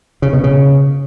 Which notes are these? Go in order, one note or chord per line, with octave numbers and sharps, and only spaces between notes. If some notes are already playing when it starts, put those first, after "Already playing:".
C#3
B2
C#3